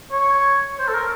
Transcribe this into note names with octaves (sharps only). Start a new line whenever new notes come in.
C#5
C5
A4
A#4